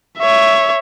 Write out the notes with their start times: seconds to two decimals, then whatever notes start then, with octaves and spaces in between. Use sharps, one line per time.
0.19 C#5 E5